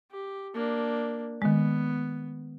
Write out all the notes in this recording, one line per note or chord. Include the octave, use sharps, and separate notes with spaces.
G4
A#3 D4
D#3 G#3 B3